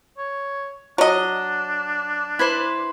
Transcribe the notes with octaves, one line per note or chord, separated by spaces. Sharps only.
C#5
F#3 D4 D#5
E4 B4 C5